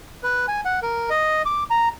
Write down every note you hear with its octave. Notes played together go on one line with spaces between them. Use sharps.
B4
G#5
F#5
A#4
D#5
D6
A#5